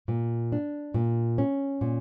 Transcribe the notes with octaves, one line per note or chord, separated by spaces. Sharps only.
A#2
D4
A#2
C#4
A#2